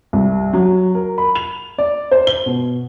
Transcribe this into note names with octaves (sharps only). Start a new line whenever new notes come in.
C2
F#3
A#4
B5
F7
D5
C5
G7
B2